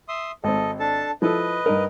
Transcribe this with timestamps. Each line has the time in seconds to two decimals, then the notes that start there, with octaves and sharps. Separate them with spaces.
0.08 E5 C6 D#6
0.44 G#1 C4 A4 D#5
0.79 D4 A4 A5
1.22 F3 E4 A4 B4 D#5
1.66 G2 D#4 A#4